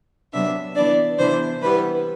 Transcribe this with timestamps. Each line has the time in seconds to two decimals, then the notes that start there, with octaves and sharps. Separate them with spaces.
0.32 C3 F#3 B3 D4 E5
0.75 E3 B3 D4 D5
1.18 C3 E3 B3 D4 C5
1.62 E3 G3 B3 B4